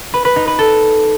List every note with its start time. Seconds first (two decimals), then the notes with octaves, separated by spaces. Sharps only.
0.14 B4
0.25 B4
0.36 D#4
0.47 B4
0.59 A4